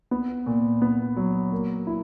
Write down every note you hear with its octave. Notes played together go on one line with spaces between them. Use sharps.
B3
A#2
B3
F#3
A#3
E4